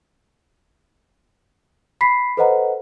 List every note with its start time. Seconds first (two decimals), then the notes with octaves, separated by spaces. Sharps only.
2.01 B5 B6 C7
2.37 A4 B4 C5 D#5 F#5 A#5